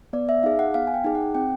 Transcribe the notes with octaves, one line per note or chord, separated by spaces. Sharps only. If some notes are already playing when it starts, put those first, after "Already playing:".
B3 D5
E5
D#4 G#4 F5
F#5
B3 F5
G#5
G5
D#4 G#4
F#5
C4 G5